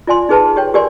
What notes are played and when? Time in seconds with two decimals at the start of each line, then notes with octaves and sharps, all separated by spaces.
0.07 F4 D5 G#5 C6
0.29 D#4 G#4 B4 A5
0.56 G4 C#5 G5
0.74 G4 A#4 D5 G#5 C6